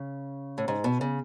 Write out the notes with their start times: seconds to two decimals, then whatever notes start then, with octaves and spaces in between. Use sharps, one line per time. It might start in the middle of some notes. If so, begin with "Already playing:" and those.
Already playing: C#3
0.58 A2
0.68 G#2
0.84 B2
1.01 C#3